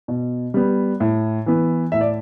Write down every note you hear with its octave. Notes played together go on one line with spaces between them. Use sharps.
B2
G3 B3
A2
E3 B3
A2 E5
D5